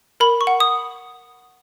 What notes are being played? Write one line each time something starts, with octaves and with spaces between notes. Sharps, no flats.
A#4 B5
C#6
F#5
D#6